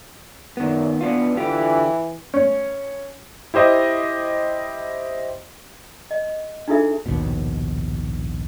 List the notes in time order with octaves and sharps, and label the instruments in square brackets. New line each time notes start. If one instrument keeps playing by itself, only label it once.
[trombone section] F#2 A#2 [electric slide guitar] D#3 B3
[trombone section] B2 E3 [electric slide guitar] B3 D4 F4
[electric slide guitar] D3 F4 G4 [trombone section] E3
[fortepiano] C#4
[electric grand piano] E4 G4 C5 D#5
[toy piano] D#5
D4 D#4 F4 G#4 A4 E5
[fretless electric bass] A#1 D#2 G#2 B2